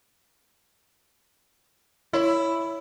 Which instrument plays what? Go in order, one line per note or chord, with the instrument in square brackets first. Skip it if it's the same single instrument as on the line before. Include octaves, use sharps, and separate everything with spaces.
[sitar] E4 [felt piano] C#5